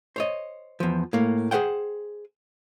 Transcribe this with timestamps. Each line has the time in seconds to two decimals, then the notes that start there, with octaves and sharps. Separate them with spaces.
0.16 C5 C#5 D#5
0.80 E2 F3
1.13 A2 A#3
1.51 G#4 B4 C5 F#5 G5